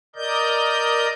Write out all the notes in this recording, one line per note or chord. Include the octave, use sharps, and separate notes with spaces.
A#4 D5 D#5 G6